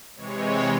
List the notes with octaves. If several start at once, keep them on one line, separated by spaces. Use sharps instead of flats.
C3 E3 G#3 C#5